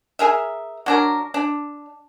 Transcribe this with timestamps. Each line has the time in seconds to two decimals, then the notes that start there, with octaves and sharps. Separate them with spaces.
0.19 G#4 A#4 E5
0.86 F#3 D4 A#4
1.34 D4